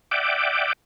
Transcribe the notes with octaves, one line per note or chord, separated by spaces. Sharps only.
D5 E5 F#5 G5 D6